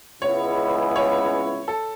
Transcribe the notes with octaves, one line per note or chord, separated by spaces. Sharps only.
C#2 C#3 G#3 B3 E4 C#5
C#5
A4